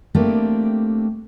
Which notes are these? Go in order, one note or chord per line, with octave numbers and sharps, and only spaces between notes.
A3 A#3 C4 D4 G4